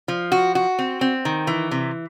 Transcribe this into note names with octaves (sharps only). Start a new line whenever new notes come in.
F3
F#4
F#4
C4
C4
D#3
E3
C3